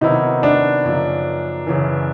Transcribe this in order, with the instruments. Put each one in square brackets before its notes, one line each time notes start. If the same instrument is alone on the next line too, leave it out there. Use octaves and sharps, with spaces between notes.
[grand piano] C3 D#3 F#3 B3 E4 [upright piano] D#4
[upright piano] D4
[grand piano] F#2 C#3 F3 A#3 D#4
F#2 C#3 E3